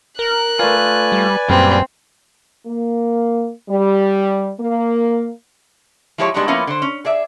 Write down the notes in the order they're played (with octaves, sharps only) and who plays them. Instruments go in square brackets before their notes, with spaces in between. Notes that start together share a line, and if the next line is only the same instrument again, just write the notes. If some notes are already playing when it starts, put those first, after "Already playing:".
[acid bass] A#4 [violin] F#6
[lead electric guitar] A3 F4 [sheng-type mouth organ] B4 D5 G#5
[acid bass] G3
[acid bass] F#2 [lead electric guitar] A#2 G3 [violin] C4
[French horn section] A#3
G3
A#3
[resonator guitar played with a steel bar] F3 G#3 E4 G4 C5 C#5
G3 G#3 B3 D4 D#4 F#4
F3 A#3 B3 C#4 E4 F4
D3 C5
C#4
G#4 D5 E5